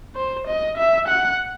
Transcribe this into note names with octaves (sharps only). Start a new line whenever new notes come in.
C5
D#5
E5
F#5